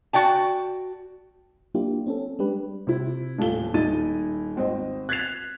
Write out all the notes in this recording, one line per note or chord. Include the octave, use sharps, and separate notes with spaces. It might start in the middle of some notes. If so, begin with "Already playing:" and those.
F#4 D5 G5 A5
F#3 A#3 D4 E4 F4 G4
C4 C#4 A4
G3 G#3 D4 G4 B4
C3 E4
D#1 A2 A3 F4 G7
D#1 D#4 E4 A6 D#7
G#1 C4 C5 D#5
F#6 G#6 A6 B6 C7 F7